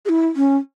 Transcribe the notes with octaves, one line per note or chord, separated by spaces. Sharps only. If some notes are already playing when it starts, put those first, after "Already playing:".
G#4
E4
C#4